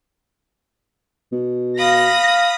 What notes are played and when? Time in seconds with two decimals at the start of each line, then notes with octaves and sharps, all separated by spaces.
1.32 B2
1.78 F5 B5 D#6 A#6